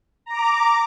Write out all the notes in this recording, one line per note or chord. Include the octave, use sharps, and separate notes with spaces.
A#5 D6